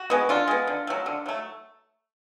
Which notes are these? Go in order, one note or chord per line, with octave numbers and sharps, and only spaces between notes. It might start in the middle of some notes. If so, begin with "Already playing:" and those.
Already playing: F#4
G#3 B3
D3 F4
G#3 B3
D3
F#3 A3
D3
F#3 A3